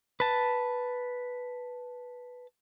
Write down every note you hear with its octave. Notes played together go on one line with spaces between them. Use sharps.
B4 A5